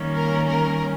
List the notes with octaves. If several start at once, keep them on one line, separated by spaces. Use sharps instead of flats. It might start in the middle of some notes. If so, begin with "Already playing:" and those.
Already playing: D#3 G3 A#3 C#4
A#4
A#4